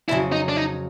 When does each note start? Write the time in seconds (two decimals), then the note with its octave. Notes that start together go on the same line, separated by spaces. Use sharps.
0.09 F2 C#3 F#3 E4
0.32 D#4
0.49 D4
0.56 D#4